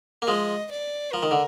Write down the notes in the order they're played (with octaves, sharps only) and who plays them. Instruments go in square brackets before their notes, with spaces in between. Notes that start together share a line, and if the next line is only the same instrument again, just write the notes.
[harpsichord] A#3
[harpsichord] F3 G#3 [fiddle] D#5
[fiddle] D5
[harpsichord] F3 [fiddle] A#4
[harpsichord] D#3
D3